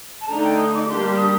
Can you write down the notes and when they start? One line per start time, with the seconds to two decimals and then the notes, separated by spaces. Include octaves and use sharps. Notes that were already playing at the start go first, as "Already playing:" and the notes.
0.21 A5
0.29 D3 A3 D#4 A#5
0.44 G5
0.58 D#6
0.74 D6
0.88 G3 A#3 D4 G4 C6
1.17 D#6